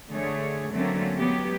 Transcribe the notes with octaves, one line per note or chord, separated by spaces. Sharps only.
D3 A3 G#4 C#5
D3 F#3 A3 A#3 C4 C#4
F#3 G#3 B3 G4